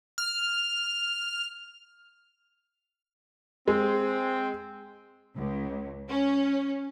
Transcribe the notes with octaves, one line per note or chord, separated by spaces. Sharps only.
F6
G#3 C4
C#2
C#4